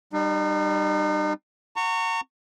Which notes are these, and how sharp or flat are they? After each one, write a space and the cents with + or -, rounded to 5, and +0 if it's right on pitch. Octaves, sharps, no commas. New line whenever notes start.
G3 +0 D#4 -40
F#5 +0 A#5 -35 C#6 +0